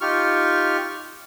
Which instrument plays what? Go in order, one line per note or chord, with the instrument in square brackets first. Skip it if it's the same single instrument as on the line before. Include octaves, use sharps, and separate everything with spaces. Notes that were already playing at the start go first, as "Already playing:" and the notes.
[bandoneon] D#4 F4 G4 C#6 F6